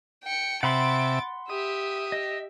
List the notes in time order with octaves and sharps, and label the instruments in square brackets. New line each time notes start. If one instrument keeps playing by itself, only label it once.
[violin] G5 C#7
[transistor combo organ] C3 E5 [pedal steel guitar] F#5 B5 C6 [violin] A6 D7
[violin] G4 E5 [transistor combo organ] D#6
[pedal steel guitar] D#5